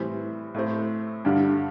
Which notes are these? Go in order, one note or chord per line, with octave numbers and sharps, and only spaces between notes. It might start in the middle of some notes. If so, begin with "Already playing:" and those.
Already playing: A2 E3 G3 C4
A2 A3 C4
G2 D3 G3 D4 G4